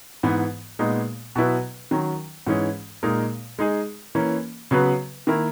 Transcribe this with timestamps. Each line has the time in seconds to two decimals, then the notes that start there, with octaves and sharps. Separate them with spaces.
0.23 G#2 E3 B3
0.79 A#2 G#3 B3 D#4
1.36 B2 F#3 B3 E4 B4
1.91 D#3 F#3 C#4
2.47 G#2 E3 G#3 C#4
3.03 A#2 G#3 D#4 A#4
3.59 G#3 D#4 G#4
4.15 E3 A#3 C#4
4.71 C#3 F#3 B3 F#4 B4
5.27 D#3 A#3 E4 A#4